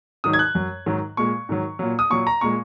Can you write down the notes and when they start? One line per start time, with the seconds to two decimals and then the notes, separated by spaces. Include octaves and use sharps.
0.24 G#2 D#3 F#3 D#6
0.33 G#6
0.39 F#6
0.55 F#2 F#3
0.86 G#2 D#3 F#3
1.17 A#2 G#3 C#6
1.49 G#2 D#3 F#3
1.79 A#2 F#3
1.99 D#6
2.10 A#2 F#3 C#6
2.27 A#5
2.41 A#2 G#3 C#6